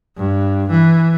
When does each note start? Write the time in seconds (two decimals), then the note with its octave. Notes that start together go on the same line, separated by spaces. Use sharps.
0.17 G2
0.70 E3